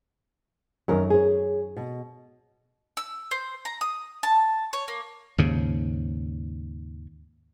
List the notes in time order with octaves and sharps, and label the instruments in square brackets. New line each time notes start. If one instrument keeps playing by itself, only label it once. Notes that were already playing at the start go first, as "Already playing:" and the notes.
[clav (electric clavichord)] F#2 D#3 F#3 [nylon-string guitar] C#4 A#4
[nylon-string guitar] G#4 C#5
B2
[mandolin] E6
C5
A#5
D#6
A5
C#5
A#3
[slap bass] D#2 G#2 C#3